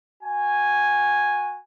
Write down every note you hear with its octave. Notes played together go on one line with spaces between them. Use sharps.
F#4 G#5